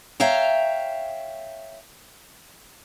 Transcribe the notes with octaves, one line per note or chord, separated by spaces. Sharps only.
C#5 E5 F5 G5 A#5